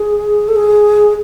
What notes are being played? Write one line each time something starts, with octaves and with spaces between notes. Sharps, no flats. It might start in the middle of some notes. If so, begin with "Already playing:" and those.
Already playing: G#4
A4
G#4